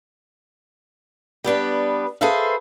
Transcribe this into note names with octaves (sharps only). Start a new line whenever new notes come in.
G3 B3 D4 B4
G#4 A4 B4 C5 E5 F5